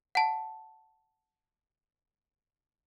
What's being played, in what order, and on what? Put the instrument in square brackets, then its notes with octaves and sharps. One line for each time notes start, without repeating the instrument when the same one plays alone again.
[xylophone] F#5 A5